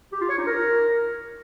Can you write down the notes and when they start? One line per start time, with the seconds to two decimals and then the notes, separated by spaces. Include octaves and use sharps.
0.12 G4
0.21 F4
0.30 C#5
0.38 D#4
0.47 A#4